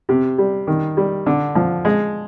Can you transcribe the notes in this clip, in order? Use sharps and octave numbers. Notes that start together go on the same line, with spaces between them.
C3
G3
D#3
G3
D3
F3
G#3